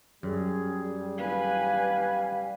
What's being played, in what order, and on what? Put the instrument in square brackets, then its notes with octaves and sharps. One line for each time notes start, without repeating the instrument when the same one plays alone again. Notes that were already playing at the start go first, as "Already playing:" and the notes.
[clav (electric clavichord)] F#2 [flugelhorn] G3 [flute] G#4
[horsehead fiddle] B4 G#5 [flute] F5